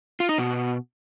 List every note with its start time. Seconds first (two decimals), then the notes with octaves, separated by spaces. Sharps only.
0.20 F4
0.29 D#4
0.38 B2